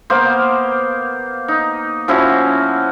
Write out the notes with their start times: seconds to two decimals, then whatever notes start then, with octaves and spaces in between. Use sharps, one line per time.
0.10 A#3 B3 C5 F5
1.48 D#4
2.08 F3 C#4 E4 F#4